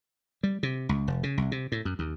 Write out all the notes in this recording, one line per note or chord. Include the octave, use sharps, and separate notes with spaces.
G3
C3
C#2
F1
C#3
C2
C3
A2
F#2
D#2